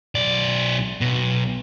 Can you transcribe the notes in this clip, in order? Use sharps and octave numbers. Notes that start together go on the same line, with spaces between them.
B1 D5
B1 B2